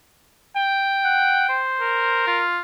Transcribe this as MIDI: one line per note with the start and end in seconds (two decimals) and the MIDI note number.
0.57 1.66 79
1.04 1.48 78
1.49 2.24 72
1.81 2.44 70
2.27 2.61 65